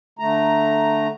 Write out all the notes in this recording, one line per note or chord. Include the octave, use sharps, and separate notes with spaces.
D3 A3 A#5